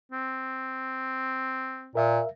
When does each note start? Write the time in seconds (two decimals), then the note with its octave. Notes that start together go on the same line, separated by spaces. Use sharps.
0.12 C4
1.95 A#2 A#4 E5 F5